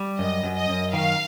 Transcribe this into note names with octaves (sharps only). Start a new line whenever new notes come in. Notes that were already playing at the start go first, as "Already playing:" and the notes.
Already playing: G3
F#2 D#5
F#2
D#5
F#2
D#3 F5